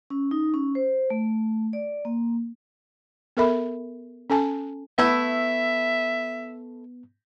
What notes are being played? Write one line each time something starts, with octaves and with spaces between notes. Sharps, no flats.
C#4
D#4
C#4
C5
A3
D5
A#3
B3 A4 A#4 E5 B5
C#4 A4 G#5 A5
A3 B3 E4 E5